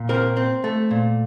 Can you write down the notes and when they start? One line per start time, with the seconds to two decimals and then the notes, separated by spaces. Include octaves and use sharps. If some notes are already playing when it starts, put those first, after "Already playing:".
Already playing: A#2
0.09 C4 A#4
0.37 C4
0.64 A3
0.91 A#2